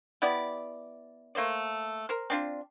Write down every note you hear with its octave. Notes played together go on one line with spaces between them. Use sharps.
B3 E4 G4 D5
A3 A#3 C5 D5
A#4 C5
C4 D4 F4